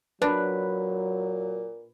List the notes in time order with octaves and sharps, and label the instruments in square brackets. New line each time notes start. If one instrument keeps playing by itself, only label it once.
[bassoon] A#2 [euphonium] F#3 [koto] D4 [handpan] B4